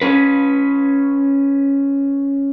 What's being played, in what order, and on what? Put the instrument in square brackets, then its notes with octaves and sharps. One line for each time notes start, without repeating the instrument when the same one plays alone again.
[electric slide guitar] C#4 B4